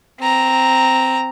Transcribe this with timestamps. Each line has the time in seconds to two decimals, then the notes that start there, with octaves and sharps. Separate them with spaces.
0.20 C4 A#5